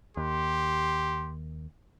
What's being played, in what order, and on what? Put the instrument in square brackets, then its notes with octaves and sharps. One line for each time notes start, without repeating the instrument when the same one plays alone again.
[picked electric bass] D#2 [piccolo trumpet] G4 [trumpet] C6